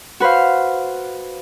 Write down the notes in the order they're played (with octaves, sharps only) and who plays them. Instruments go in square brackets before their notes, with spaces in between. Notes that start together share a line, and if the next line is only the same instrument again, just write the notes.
[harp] F#4 B4 C5 F5